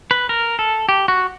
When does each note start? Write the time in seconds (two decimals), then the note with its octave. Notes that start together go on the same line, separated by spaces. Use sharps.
0.11 B4
0.29 A#4
0.59 A4
0.89 G4
1.08 F#4